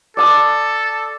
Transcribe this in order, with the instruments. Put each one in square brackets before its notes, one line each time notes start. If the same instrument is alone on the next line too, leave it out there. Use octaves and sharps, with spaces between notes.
[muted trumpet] A4 [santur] D5 A5 D#6